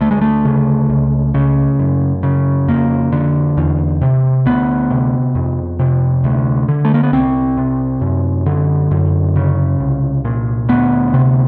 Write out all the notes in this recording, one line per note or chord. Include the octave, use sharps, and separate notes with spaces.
D2 A3
G#3
A3
C#3
C#2
C#3
F#2
C#3
F2 A#3
D3
E2
C3
D2 B3
C3
F2
C3
D2
D3
A3
A#3
B3
C2 C4
C3
F#2
D3
F#2
C#3
C2
A#2
D2 B3
C3